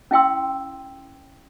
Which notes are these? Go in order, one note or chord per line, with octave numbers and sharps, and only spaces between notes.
C#4 E4 F5 G5 C6 E6